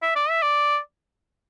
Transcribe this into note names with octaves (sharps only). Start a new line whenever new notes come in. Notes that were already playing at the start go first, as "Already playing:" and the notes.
E5
D5
E5
D5